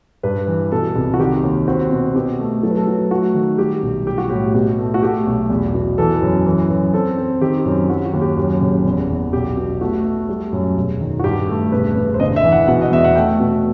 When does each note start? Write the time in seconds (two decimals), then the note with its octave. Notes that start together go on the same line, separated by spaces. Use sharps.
0.23 G2 B4
0.48 E3
0.71 B2 A4
0.96 C2
1.14 F#4
1.19 D#3 G4
1.43 D#2
1.68 C4 F#4
1.91 B2
2.15 B2 G4
2.39 A3
2.63 F#3 A4
2.70 B4
2.77 A4
2.87 F#3
3.11 A3 F#4
3.35 D#3
3.58 G3 G4
3.82 B1
4.07 G3 G4
4.18 F#4
4.30 A2 G4
4.54 B2 G4
4.79 A3
4.94 F#4
5.02 A3 G4
5.27 B1
5.50 E2
5.74 B2
5.98 E3 A4
6.22 F#2
6.46 E3
6.70 F#2
6.94 C4 A4
7.18 C4
7.41 D#3 G4
7.66 F#2
7.89 F#3 F#4
8.05 F#4
8.13 D#2
8.21 G4
8.37 F#2
8.62 F#1
8.85 E2
9.09 E2
9.33 B1 G4
9.57 B2
9.81 A3 F#4
10.05 A3
10.29 G3
10.53 F#2
10.77 E1
11.01 D#3
11.19 F#4
11.24 G2 G4
11.48 A3
11.72 E1 B4
11.96 E1
12.14 C5
12.20 G1 D#5
12.36 E5
12.44 E3
12.52 F#5
12.68 B2 F#5
12.82 D#5
12.92 E2 E5
13.04 F#5
13.16 A3 G5
13.40 B2